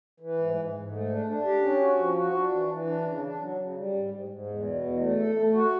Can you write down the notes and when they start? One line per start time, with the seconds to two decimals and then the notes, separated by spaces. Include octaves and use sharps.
0.20 E3
0.38 G#2
0.56 G#2
0.73 G#2
0.91 A3
1.09 D4
1.26 D4
1.44 G4
1.62 C#4
1.79 F#4
1.98 F3
2.15 F#4
2.34 D4
2.51 E3
2.69 E3
2.87 D4
3.05 C#3
3.22 D4
3.39 F#3
3.58 C#3
3.76 G3
3.93 G#2
4.10 G#2
4.28 G#2
4.46 E2
4.65 B2
4.82 E2
5.00 A3
5.17 A4
5.35 A3
5.53 F#4